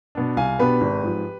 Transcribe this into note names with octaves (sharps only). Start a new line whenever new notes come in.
B2 B3 D4
C2 F5 G#5
B2 B3 D4 G4 B4
G#1
G#2 F3